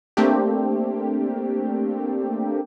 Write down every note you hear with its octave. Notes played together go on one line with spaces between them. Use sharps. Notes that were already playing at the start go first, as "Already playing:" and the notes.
A3 A#3 C4 D4 G4